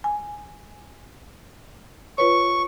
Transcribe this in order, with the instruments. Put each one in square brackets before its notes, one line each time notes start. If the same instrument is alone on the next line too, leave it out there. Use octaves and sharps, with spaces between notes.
[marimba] G#5
[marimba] F4 B4 C#5 [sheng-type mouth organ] C#6